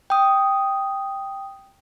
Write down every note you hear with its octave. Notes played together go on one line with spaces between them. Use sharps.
G5 D#6